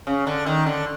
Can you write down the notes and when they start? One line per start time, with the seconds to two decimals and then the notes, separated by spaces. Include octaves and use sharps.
0.07 C#3
0.27 D3
0.46 D#3
0.66 D3